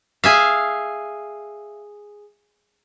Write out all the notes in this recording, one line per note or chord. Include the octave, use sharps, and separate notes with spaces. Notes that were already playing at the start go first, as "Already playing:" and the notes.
G#4 E5 F5